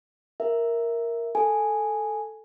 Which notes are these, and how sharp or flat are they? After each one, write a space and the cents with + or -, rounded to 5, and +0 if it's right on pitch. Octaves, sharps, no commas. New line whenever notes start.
A#4 +0 E5 +0
A4 +0 G#5 +0